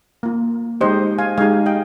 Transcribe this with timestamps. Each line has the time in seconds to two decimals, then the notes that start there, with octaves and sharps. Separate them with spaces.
0.23 A#3 F4
0.81 G#3 D#4 G4 C5 D#5
1.18 F5 G#5
1.38 G#3 D#4 G4 F5 G#5
1.66 D#5 G5